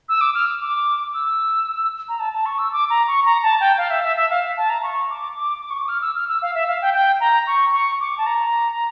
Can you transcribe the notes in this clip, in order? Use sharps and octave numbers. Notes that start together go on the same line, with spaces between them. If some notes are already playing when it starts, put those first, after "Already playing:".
E6
D6
F6
D6
E6
A#5
A5
A5
C#6
E6
D6
A#5
C#6
A#5
A5
G5
F5
E5
E5
E5
F5
A5
A#5
C#6
D6
D6
D6
C#6
D6
F6
E6
F6
E6
F5
E5
F5
G5
G5
A#5
C#6
C#6
D6
A5
A#5